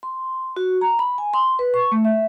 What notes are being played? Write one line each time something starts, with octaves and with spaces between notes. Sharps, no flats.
C6
F#4
A#5
B5
G#5
C6
B4
C#6
A3
E5